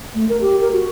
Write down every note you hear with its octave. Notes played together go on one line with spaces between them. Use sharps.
A3
A#4
G4
A#4
F#4